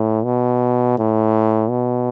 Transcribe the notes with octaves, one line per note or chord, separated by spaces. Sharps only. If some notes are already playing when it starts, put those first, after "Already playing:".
Already playing: A2
B2
A2
B2